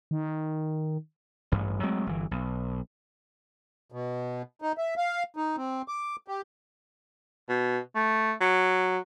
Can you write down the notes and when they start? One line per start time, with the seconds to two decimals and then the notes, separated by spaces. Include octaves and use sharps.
0.11 D#3
1.52 A1 G2
1.83 F#3 G#3 A3 C4
2.07 G1 E3
2.31 B1
3.92 B2
4.62 D#4
4.78 E5
4.97 F5
5.37 D#4
5.57 C4
5.88 D6
6.28 G4
7.49 B2
7.96 A3
8.41 F#3